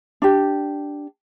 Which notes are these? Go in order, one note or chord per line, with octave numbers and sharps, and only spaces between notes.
D4 G4